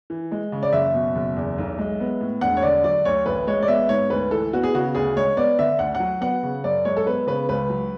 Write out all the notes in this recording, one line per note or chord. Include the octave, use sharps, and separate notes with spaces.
E3
G#3
C#3
D5
F#1 E5
B2
F#1
E2
B1
G#3
B3
A2
E1 F#5
C#5
D3 D5
F#3 D5
D2 C#5
A1 B4
G#3 C#5
D5
B3 E5
G#2 C#5
D2 B4
E3 A4
B3 F#4
G#4
C#3 F#4
D2 G#4
G#3 C#5
B3 D5
D3 E5
D2 F#5
F#5
F#3
B3 F#5
C#3
F#2 D5
G#3 C#5
A4
B3 B4
C#3 B4
C#2 B4
F#3